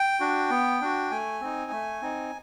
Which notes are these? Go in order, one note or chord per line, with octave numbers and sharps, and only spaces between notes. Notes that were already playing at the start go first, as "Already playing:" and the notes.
Already playing: G5
D4 F#4
B3
D4 F#4
A3 G#5
C4 D#4
A3
C4 D#4